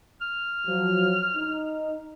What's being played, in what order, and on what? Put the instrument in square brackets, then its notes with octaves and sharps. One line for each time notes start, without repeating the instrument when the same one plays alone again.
[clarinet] F6
[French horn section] F3 F#3
D#4